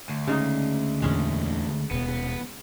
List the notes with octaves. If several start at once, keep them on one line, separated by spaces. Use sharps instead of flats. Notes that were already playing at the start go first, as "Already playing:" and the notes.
D2
C#3 G#3 D#4
E2 A#2 D3 G#3 C#4
D#1 B2 B3